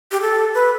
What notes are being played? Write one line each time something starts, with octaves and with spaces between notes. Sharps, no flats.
G4
A4
B4